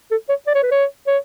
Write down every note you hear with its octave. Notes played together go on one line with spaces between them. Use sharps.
A4
C#5
D5
C#5
B4
C#5
C#5